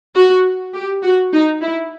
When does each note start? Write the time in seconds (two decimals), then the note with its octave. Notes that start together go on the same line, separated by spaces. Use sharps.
0.15 F#4
0.74 G4
1.03 F#4
1.33 D#4
1.62 E4